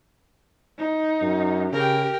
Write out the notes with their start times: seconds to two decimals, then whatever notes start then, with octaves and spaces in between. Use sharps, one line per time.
0.78 D#4
1.21 F#2
1.73 C#3 G4 A#4 G5